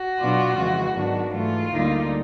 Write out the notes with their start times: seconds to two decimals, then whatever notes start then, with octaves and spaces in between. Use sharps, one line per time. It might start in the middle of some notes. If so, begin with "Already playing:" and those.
Already playing: F#4
0.19 B2 F#3 B3 D4 F4
0.57 F2 C#3 E3 G#3
0.95 G#2 D#3 F#3 B3 D4
1.33 G#2 E3 A3 F4
1.71 D2 D3 G3 A#3 D#4